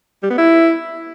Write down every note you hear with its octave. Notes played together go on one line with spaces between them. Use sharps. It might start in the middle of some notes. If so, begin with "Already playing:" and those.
G3
B3
E4